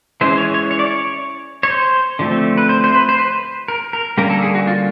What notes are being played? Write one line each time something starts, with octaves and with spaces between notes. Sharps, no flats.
E3 G#3 C#4 C5
C#5
C#5
C#5
D5
C#5
C#5
C5
D3 F3 A3 C4
B4
C5
C5
B4
C5
B4
A#4
A#4
D3 G3 A#3 C#4 A#4
A4
G#4
F#4
F4